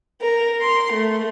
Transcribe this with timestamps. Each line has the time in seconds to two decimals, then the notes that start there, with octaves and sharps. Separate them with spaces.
0.21 A#4
0.60 C6
0.92 A3